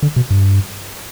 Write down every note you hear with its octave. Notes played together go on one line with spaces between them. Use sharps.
D3
B2
G2